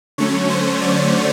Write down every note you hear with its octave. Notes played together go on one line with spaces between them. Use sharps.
D3 F#3 A3 C#4 C#5
C5
D5